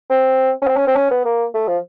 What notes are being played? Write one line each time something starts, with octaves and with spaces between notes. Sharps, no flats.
C4
C#4
C4
C#4
C4
C#4
B3
A#3
A3
F3